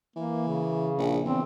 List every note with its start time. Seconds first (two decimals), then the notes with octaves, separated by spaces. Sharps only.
0.16 E3 A#3
0.47 C#3
0.98 A#1
1.25 E2 C4